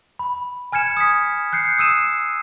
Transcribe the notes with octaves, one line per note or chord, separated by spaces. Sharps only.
B5
G#5 F6 G#6 C#7 E7
D#6 G#6 B6
F#6 G6 C7 C#7
D#6 E6 D#7 E7